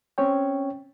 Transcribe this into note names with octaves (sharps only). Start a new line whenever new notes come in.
C4 C#4 C#5 G5